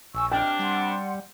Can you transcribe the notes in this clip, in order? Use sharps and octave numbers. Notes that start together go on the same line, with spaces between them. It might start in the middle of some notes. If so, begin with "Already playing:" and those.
A#1 G#5 C#6 E6
C3 D4 D#5 G5 F6
G3 F#5 C6